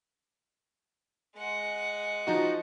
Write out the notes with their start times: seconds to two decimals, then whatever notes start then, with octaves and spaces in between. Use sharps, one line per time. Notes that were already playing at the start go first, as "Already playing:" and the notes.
1.36 G#3 F#5
2.27 F3 D#4 F#4